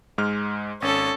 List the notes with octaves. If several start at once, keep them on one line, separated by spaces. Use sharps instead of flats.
G#2 G#3 F6
G#1 C#4 A4